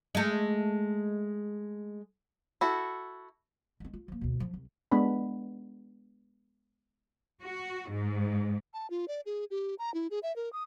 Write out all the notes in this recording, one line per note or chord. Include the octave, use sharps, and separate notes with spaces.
G#3 A3
E4 F#4 A4
G#3 C4
F4
F3 A#3
D2 B2
F3
C2
G#3 B3 D4 B5
F#4
G#2
A5
F4
D5
G#4
G4
A#5
E4
G#4
E5
A#4
D#6